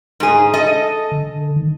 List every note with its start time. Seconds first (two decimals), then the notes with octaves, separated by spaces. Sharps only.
0.20 G#2 G#4
0.54 A4 D#5
1.12 D3
1.56 D#3